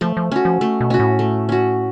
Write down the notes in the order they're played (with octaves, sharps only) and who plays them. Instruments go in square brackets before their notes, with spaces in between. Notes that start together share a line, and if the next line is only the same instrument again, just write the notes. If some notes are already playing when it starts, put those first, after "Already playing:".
[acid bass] F3 [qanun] A3
[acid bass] F3
[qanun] C#4 F#4
[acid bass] F3
[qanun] A3
[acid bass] B2
[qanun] C#4 F#4
[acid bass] A2
[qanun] A3
C#4 F#4